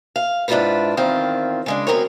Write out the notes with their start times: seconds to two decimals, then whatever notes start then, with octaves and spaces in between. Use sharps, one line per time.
0.16 F5
0.48 G#2 D4 E4 F4 A#4 B4
0.97 E2 D#3 C4 F4
1.66 C#3 G#3 D4
1.87 F#2 B2 B3 C4 A#4 C#5